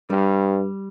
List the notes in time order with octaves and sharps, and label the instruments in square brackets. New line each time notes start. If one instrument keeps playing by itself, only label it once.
[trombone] G2 [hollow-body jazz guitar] G3